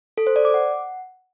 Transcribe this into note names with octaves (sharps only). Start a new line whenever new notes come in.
A4
C5
D5
D6
F#5